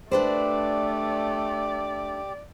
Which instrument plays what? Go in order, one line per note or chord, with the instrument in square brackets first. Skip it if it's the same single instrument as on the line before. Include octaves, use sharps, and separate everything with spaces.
[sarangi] A3 [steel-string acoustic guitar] D4 B4 C5 [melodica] G4 [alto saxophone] D5